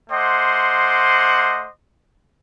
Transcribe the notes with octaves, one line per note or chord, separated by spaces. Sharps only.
A3 C5 D#5 F#5 C6 D6